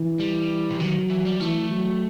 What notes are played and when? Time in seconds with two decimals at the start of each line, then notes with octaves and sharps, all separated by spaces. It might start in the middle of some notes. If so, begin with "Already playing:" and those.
Already playing: E3
0.19 G3
0.70 C3
0.80 D#3 F#3
1.10 E3
1.25 G3
1.40 E3 A3
1.70 F#3